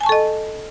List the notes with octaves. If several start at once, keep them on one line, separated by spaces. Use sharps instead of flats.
A4 D#5 G#5 A5 C#6